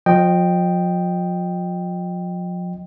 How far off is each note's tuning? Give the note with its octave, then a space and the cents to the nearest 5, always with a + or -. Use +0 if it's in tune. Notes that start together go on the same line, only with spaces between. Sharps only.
F3 +35 D#5 -10 G5 +0